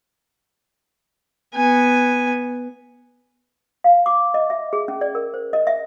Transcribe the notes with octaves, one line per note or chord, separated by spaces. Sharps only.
B3 G#5
F5
D6
D#5
E5
G#4
C#4
D5
A#4
C5
D#5
E5